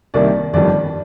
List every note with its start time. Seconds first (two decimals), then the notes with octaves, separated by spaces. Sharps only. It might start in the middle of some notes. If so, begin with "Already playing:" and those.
0.14 C2 C3 D#3 A#3 D5
0.53 G1 F2 D#3 G3 D5